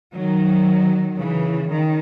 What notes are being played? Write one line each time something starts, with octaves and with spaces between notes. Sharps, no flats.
D#3 F#3
C#3 E3
D#3